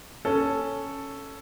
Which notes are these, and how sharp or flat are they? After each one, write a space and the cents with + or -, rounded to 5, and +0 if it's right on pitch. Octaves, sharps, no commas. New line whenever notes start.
C#4 +0 A4 +0